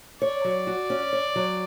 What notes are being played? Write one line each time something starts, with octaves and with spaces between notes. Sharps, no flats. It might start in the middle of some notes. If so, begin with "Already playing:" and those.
C#5 D5
F#3
F#4
C#4
C#5
F#3